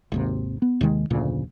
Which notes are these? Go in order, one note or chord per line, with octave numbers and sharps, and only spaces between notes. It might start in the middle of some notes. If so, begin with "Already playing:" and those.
G#1 D#2 C3
B3
D#2 C3 D#3 G#3
F1 D2 A#2 C#3